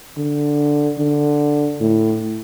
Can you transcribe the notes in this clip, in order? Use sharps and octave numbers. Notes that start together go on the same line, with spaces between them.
D3
D3
A2